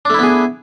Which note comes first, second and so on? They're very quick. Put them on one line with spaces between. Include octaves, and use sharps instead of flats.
D4 A3 E4 B3 G#4